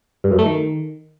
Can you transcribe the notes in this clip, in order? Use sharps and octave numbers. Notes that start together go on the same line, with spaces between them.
G2
F#2
A3
D#3